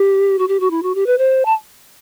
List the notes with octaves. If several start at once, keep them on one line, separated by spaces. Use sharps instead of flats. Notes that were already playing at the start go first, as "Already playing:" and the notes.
Already playing: G4
F#4
G4
F#4
E4
F#4
G4
B4
C5
A5